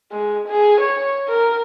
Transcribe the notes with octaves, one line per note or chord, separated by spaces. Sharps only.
G#3
G#4
C#5
A#4